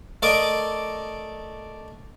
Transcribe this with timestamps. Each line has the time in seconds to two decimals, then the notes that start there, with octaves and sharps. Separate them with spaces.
0.22 A3 A#4 D5 D#5 D6